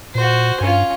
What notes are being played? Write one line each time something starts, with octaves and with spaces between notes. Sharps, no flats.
A#2 F#4 C5
G2 C#4 F4